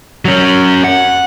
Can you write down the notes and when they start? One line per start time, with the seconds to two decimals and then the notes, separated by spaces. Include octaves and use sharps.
0.25 F#3 C#4
0.84 F#5